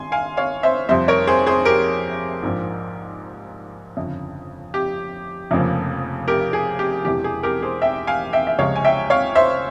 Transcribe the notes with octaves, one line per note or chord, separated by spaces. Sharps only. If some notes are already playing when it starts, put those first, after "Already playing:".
Already playing: G#1 G2 G#5 C6
F5 G#5
C#5 F5
C5 E5
F2 C3 G3 C5 E5
A#4 C#5
G#4 C5
G#4 C5
G4 A#4
A#1 G#2 F3
G1 F2 C#3
G4
F1 F2 C#3 F3 A#3
G4 A#4
G#4
G4
E1 E2 C3 E3 G4
G#4
G4 A#4
G#4 C5
E5 G5
F5 G#5
E5 G5
E5
C#2 C3 F3 G#3 C#5 F5
G#5
E5 G5
C#5 F5
C5 E5